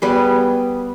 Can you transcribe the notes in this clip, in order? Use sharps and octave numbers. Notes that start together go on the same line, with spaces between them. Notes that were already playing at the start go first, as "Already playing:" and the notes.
G3 B3 G#4